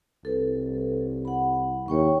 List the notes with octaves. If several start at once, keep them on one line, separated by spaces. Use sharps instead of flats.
C2 A4 B4
F#5 B5
D#2 C#5 G5 C#6